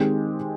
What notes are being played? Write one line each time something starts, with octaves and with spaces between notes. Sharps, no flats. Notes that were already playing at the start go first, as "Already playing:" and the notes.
Already playing: D#3 G#3 C4 G4